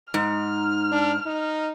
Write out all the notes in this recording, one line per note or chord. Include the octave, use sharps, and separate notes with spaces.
G#2 D#4 F6
D4
D#4